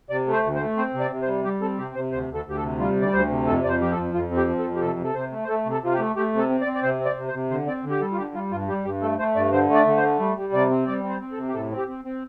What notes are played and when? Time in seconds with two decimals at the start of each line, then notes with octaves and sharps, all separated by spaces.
0.10 C3 D5
0.27 A3
0.33 C5
0.43 D2
0.55 C5
0.60 A3
0.77 C4 C5
0.94 C3
1.00 D5
1.11 C3
1.22 C5
1.28 G3
1.44 G3 G4
1.61 C4 A4
1.79 C3 G4
1.95 C3 C5
2.12 D2 C5
2.29 D2
2.34 A4
2.46 D2 G4
2.57 A4
2.62 C3
2.79 G3 F4
2.96 D2
3.02 D5
3.13 D2 C5
3.30 C3
3.47 F2 A4
3.63 F2 D5
3.69 C5
3.81 F3 G4
3.91 A4
3.97 F2
4.14 F2 F4
4.31 C4
4.37 G4
4.47 F3
4.59 A4
4.64 F2
4.76 G4
4.81 C3 A4
4.98 C3
5.04 A4
5.15 C3 C5
5.32 A3
5.44 C5
5.48 A3 A4
5.65 C3
5.71 A4
5.82 C3 F4
5.94 G4
5.99 A3
6.16 A3 G4
6.33 C3 A4
6.49 C4
6.61 D5
6.66 C4
6.75 D5
6.83 C3 C5
7.00 C4
7.05 D5
7.17 C3
7.28 C5
7.34 C3
7.50 D3 C5
7.67 C4 D5
7.84 D3
7.90 G4
8.01 G3 A4
8.12 F4
8.18 D3 G4
8.34 G3 F4
8.51 G2 F4
8.68 G3 G4
8.85 G2 G4
9.02 A3 A4
9.19 A3 C5
9.35 G2 D5
9.52 D3 C5
9.69 A3
9.74 D5
9.86 D3
9.97 C5
10.03 A3
10.20 G3
10.36 G3
10.53 C3 D5
10.70 C4
10.87 G3 D5
11.03 C4
11.10 C5
11.20 C4
11.32 A4
11.37 C3
11.49 G4
11.54 A2 A4
11.71 C4
11.77 G4
11.88 C4
12.05 C4